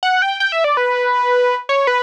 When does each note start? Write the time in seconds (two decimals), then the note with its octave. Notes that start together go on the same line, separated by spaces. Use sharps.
0.03 F#5
0.22 G5
0.40 G5
0.52 E5
0.64 D5
0.77 B4
1.69 C#5
1.87 B4